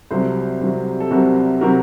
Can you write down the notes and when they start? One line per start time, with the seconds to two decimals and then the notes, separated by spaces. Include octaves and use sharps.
0.11 C2 C3 F#3 A4 C5
0.61 C2 C3 F#3
1.00 A4
1.11 C2 C3 F#3 F#4 A#4
1.61 C3 F#3 F#4 A#4